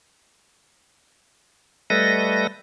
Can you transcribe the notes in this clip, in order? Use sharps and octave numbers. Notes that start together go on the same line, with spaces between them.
G3 A3 A4 B4 D#5 A#6